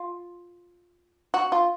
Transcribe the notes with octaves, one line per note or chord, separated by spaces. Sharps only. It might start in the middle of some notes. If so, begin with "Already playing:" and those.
Already playing: F4
F#4
F4